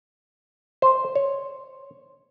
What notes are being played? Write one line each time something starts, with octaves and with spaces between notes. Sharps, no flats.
C5
C#5